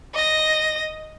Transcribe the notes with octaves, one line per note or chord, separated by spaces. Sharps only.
D#5 A#6